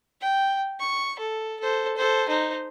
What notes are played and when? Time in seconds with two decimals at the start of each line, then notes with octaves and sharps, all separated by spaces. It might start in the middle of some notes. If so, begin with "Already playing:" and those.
0.21 G5
0.80 C#6
1.19 A4
1.60 A4 C5
1.97 A4 C5
2.29 D#4 C5